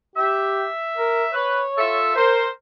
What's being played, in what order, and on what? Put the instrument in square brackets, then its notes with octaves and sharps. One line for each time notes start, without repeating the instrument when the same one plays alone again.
[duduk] G4 [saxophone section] E5
[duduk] A#4
[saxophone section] B4 [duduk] C#5
[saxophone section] F4 A4 E5
[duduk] A#4 [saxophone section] C5